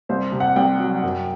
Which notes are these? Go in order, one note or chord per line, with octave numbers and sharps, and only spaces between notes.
C2 C5
C3
F#5
C2 G5
F#3
F#2